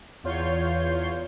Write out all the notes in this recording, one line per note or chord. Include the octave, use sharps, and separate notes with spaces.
E2 F4 C#5 G6 C7